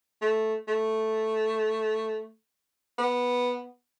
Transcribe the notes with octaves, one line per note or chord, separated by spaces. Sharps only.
A3
A3
B3